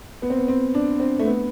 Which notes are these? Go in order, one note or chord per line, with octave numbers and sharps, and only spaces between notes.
B3
C4
B3
C4
D4
C4
A3
B3